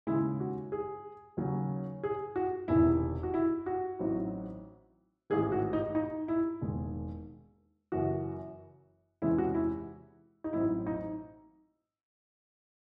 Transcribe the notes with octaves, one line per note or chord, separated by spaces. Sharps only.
D#2 C#3 G#3 E4
F#4
G#4
D#2 C#3 F#3 C#4
G#4
F#4
E1 E2 C3 D#3 E4
F#4
E4
F#4
A1 A2 F#3 C4 D#4
A1 G#2 D#3 G#4
F#4
D#4
D#4
E4
E1 D#2 D#3 G#3
F#1 F#2 E3 F#4
E2 C3 E3 G#3 C#4 E4
F#4
E4
D#4
A1 A2 F#3 C4 E4
D#4